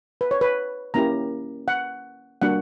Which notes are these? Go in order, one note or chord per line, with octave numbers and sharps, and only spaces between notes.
B4
C#5
B4
A#3 C#4 E4 G4 A#5
F#5
G3 A#3 D4 F#4 F#5